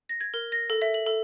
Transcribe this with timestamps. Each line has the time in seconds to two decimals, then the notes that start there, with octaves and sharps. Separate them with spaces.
0.09 A#6
0.21 G#6
0.34 A#4
0.52 A#6
0.70 A4
0.82 E5
0.94 F#7
1.06 A4